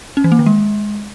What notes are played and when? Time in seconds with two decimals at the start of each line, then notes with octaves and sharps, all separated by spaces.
0.17 C#4
0.24 E3
0.32 A#3
0.39 D#3
0.46 G#3